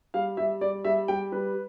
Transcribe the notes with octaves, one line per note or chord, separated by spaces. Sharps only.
G3 F5
G3 E5
G3 D5
G3 E5
G3 G5
G3 B4